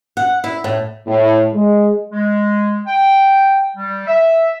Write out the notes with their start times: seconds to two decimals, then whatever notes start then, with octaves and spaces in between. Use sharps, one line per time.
0.17 F#5
0.44 E4
0.64 A2
1.07 A2
1.53 G#3
2.12 G#3
2.87 G5
3.77 G3
4.07 E5